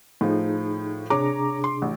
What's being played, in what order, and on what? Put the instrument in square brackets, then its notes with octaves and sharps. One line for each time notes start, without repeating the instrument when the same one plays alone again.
[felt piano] A2 F3 [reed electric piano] D#4 G#4
[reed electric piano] C3 D4 G#4 [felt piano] C#5 A#5 D6
[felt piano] C6
A1